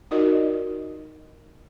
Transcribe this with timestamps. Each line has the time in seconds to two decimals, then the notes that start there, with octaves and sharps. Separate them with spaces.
0.11 D#4 F4 F#4 A#4 D5 D#5